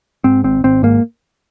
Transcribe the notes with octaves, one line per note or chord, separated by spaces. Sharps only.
G#2 C4
G#1 C4
G#1 C4
G#2 A#3